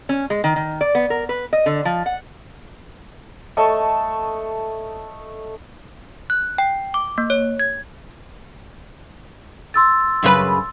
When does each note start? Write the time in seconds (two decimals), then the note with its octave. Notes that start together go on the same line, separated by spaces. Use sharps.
0.09 C#4
0.30 G#3
0.44 D#3
0.56 D#3
0.81 D5
0.95 B3
1.10 A#4
1.29 B4
1.53 D#5
1.66 D3
1.85 F3
2.06 F#5
3.57 A3 C#5 D#5 A5
6.30 F#6
6.58 G5
6.94 D6
7.18 A#3
7.30 C#5
7.60 G#6
9.74 C6 E6 A6
10.23 F#2 C#3 B4